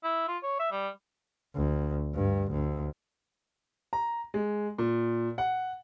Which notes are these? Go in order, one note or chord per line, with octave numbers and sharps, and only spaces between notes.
E4
F4
C#5
E5
G3
D2
G2
D2
A#5
G#3
A#2
F#5